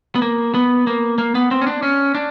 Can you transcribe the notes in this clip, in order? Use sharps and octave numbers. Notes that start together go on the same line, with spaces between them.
B3
A#3
B3
A#3
A#3
B3
C4
C#4
D4
C#4
D4